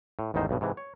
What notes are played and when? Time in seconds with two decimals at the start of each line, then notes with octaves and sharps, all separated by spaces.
0.19 A2
0.34 A1 E2 G#2 D#3 D#4 C5
0.49 B1 G2 B2
0.61 G#2 C3 E3
0.77 C#5